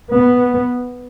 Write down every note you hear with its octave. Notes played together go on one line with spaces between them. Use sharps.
B3